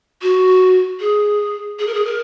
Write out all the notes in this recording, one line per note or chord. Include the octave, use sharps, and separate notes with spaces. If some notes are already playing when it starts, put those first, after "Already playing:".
F#4
G#4
G#4
A#4
G#4
A#4